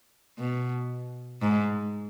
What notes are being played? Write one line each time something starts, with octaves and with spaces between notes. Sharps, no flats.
B2
G#2